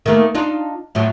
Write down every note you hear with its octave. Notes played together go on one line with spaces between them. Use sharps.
D#3 A3 A#3
D4 D#4 F4
A2 F3 F#3